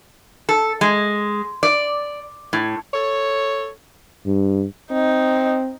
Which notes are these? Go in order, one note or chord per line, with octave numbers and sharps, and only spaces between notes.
A4
G#3
D5
A2
A4 C#5
G2
C4 D#4